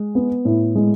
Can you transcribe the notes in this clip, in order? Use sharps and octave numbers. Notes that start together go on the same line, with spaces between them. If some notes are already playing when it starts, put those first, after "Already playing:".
Already playing: G#3
B3
A2
G#3